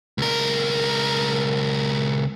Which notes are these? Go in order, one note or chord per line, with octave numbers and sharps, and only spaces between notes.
C#2 A#4